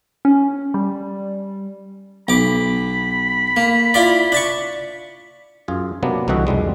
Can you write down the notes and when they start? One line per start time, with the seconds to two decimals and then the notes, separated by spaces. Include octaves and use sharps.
0.25 C#4
0.74 G3
2.28 B1 B5 D6
3.57 A#3
3.94 E4 F4 D5
4.32 D4 A5 C#6
5.68 F#2 F4 G#4
6.03 C3 F#3 A#3 B3 D4
6.28 C2 D3 E3 F#4 D#5 E5
6.47 C2 F2 G3 G#3